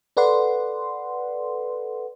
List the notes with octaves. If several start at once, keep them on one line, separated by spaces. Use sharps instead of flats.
A4 B4 D5 F#5 C6